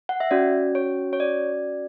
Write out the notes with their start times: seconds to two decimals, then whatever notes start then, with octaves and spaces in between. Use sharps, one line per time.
0.09 F#5
0.20 E5
0.31 C#4 F#4 D5
0.75 C#5
1.13 C#5
1.20 D5